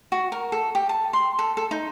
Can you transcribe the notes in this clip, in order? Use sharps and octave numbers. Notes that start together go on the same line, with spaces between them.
F#4
A#4
A4
G4
A5
C6
A4
A4
D#4